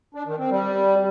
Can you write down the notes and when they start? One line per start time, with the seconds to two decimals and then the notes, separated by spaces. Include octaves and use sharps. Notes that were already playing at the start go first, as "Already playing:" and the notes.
0.14 D4
0.26 D#3
0.38 C4
0.50 G3